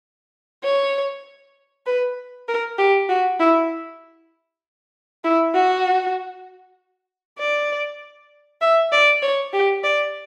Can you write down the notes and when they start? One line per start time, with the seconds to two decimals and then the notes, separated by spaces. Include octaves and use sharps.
0.64 C#5
1.86 B4
2.48 A#4
2.78 G4
3.09 F#4
3.40 E4
5.24 E4
5.55 F#4
7.39 D5
8.61 E5
8.92 D5
9.23 C#5
9.53 G4
9.84 D5